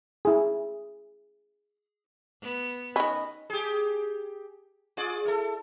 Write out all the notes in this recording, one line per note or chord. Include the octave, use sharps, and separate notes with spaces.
E4 G#4
B3
D#3 C#4 D#5 B5
G4 G#4
F4 G#4 D5
E4 A4